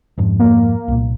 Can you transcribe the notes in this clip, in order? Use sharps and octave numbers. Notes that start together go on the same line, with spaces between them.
F2 G#2 F3
A#3
C2 A#2